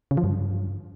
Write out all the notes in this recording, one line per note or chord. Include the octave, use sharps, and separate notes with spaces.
C#3
F3
G2